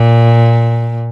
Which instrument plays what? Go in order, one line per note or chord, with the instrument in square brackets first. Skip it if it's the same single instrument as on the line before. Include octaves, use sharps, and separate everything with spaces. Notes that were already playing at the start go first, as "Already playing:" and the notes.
Already playing: [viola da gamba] A#2